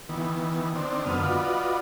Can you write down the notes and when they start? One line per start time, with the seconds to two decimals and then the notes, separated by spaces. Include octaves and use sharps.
0.09 D#3 E3 B3
0.75 D#3 C4 D4
1.06 F#2 D3 B3 D#6 F6
1.23 F4 F#4 B4 D5 D#5